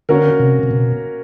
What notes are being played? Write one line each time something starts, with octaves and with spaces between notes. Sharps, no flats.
D3 A#3 C#4 F#4 A#4
C3
C3
B2